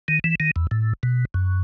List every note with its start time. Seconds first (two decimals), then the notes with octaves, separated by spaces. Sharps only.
0.08 D#3
0.24 E3
0.40 D#3
0.56 E2
0.71 A2
1.03 B2
1.34 F#2